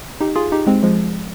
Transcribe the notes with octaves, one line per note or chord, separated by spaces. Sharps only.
D#4 G4
F4 G#4
D#4 G4
G#3 C4
F3 G#3